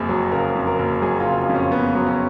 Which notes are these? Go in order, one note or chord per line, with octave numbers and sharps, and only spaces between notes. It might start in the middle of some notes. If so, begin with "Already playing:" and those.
Already playing: F#1 F2 G#4
F#3
C#3 A#4
F2
A#4
F#1
F#3 G#4
F4
C#3
F2
C#4
F#1 B3
F#3
C#4